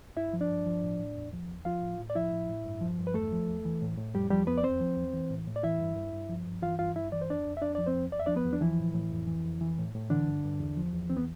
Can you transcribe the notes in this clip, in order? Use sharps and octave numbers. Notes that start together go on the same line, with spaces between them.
G2 E4 E5
F3
D4 D5
G2
F3
A2
A2
E2
F3
E2
F3 F4 F5
A2
A2
D5
F3 E4 E5
A2
A2
G2
F3
G2
B4
E2 A3 A4
F3
E2
E3
A2
A2
F2 G3 G4
F3 G3 G4
F2 B3 B4
D5
E2 C4 C5
F3
E2
E3
A2
A2
D5
E3 E4 E5
G2
G2
G2
F3
G2
E3 F4 F5
G2 F4 F5
G2 E4 E5
E3 D5
C5
F2 D4 D5
F2
E5
F2 D4 D5
F3 D5
C4 C5
F2
E2 D5
E5
F3 D4 D5
B3 B4
E2
D4
E3 F3 E4
A2
A2
F2
E3
F2
E3
A2
A2
D3 E3 D4
G2
G2
E2
F3
E2
E3 C4
B3